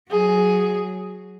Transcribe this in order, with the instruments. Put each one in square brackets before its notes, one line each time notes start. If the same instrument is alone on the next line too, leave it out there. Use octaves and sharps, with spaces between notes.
[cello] F#3 [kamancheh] G#4